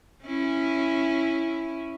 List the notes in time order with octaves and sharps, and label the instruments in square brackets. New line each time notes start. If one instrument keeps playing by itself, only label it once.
[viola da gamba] C#4 E4